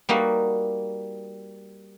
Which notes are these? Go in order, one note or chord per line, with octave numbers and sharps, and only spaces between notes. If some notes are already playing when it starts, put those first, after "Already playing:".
G3 A#3 D#4 F#4